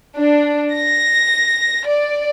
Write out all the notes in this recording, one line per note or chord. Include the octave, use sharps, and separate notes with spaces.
D4
A#6
D5